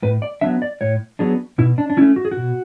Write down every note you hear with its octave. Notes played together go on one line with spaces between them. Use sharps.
A2 B4
D5
F#3 B3 D4 E5
D5
A2 C#5
F#3 B3 D4 G#4
B2 E4
D4
D4
A3 C#4 E4
F#4
G#4
F#4
B2